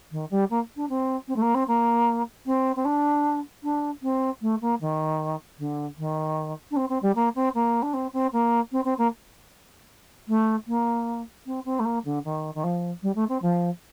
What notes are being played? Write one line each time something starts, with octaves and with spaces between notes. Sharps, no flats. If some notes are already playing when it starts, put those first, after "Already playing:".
D#3
G3
A#3
D4
C4
C4
A3
A#3
C4
A#3
C4
C4
D4
D4
C4
A3
A#3
D#3
D3
D#3
D4
C4
C4
G3
A#3
C4
A#3
D4
C4
C4
A#3
C4
C4
A#3
A3
A#3
C4
C4
A3
A#3
D3
D#3
D#3
F3
G3
A3
C4
F3